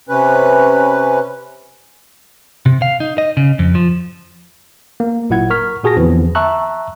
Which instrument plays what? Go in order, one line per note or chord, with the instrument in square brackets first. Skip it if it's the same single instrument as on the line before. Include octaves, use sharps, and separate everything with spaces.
[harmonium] C3 C#4 B4
[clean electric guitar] C3
F5
D#4
D#5
C#3
F2
F3
[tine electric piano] A#3
G1 A#2 F#3 E4 F#5 G#6
A#4 C#6 F6 B6
A#2 F#4 G#4 A5 C#6 A#6
E2 D3 E3 F3 B3 C4
E5 A5 A#5 C#6 E6 F#6